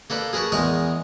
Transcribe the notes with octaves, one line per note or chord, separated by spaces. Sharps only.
A#3 A4 B4 D5
G#4 A#4 B4 A5 C#6
E2 G#3 A#4 C#6 D#6